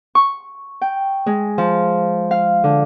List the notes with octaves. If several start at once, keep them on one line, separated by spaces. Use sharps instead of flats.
C#6
G5
G#3
F3
F5
D3